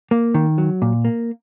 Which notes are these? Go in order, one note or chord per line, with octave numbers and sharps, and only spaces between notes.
A#3
D#3
F#3
A#2
A#3